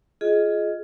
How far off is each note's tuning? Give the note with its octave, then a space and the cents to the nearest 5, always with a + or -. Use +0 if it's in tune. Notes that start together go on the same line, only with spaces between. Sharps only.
F4 +0 G#4 +20 D#5 +0